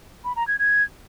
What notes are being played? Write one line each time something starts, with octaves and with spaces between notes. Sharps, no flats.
B5
A#5
G#6
G#6